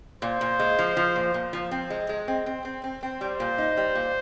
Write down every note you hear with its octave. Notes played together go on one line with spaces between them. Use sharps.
A#2 C5
A#2
G#3
F3
F3
A#2
A#2
F3
C4
G#3
G#3
C4
C4
C4
C4
C4
G3 C5
A#2
D#4
G3
A#2